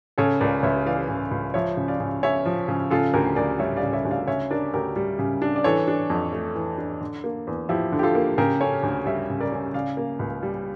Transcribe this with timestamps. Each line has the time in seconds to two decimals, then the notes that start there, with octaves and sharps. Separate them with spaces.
0.18 C#3 A4 C#5
0.40 C#2 A#4 D5
0.63 C#2 C#5 E5
0.86 E3 D5 F5
1.09 C#3
1.31 C#2
1.54 F3 C#5 E5
1.77 C#3
1.88 D5 F5
2.00 C#3
2.23 C#4 C#5 E5
2.45 F3
2.68 C#3
2.91 C#3 F4 A4
3.13 D2 G4 A#4
3.36 D2 A#4 D5
3.59 G3 C#5 E5
3.76 D5 F5
3.83 C#3
3.93 C#5 E5
4.05 D2
4.11 D5 F5
4.27 C#3 C#5 E5
4.51 D4 A#4 D5
4.74 D2 G4 A#4
4.96 G3
5.19 C#3
5.42 D4
5.56 D5
5.64 E3 A4 C#5
5.88 D4
6.10 F2
6.33 A3
6.55 E3
6.78 D4
7.01 D3
7.24 A#3
7.47 E2
7.69 F3 E4 G4
7.92 D3
7.99 G4
8.03 F4 A4
8.15 A#3
8.38 C#3 G4 A#4
8.61 C#4 A4 C#5
8.83 D2
9.06 G3 C#5 E5
9.29 C#3
9.40 A#4 D5
9.52 C#4
9.74 C#3 D5 F5
9.97 A#3
10.19 C#2
10.43 G3